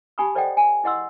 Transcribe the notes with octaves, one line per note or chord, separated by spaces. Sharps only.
D#4 G4 G#5 B5 C#6 D#6
A4 C5 D5 D#5 F#5 G5
G#5
E4 G#4 D#5 F#5 C6 E6